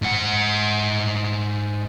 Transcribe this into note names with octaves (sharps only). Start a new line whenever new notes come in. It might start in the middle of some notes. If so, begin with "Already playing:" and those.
G#2 F#5